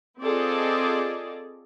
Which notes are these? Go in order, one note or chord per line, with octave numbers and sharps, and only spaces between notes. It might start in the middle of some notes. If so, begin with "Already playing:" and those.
C4 F4 G#4 A4 D5 D#5